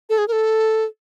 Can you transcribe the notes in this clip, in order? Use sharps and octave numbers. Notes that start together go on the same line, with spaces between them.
A4
G#4
A#4
A4